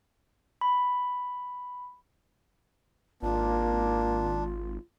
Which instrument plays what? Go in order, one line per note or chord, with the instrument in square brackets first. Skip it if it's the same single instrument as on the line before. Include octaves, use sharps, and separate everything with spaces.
[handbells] B5
[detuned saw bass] G#1 [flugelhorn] A#3 [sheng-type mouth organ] D4 [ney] F4